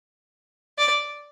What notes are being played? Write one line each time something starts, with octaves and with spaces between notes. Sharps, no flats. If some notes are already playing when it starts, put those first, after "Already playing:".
D5